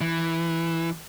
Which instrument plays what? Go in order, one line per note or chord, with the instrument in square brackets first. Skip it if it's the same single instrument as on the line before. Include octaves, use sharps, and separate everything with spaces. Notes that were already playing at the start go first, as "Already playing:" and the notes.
[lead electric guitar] E3